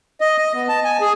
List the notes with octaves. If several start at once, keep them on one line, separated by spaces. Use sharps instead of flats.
D#5
D#5
B3
A5
G#5
G#4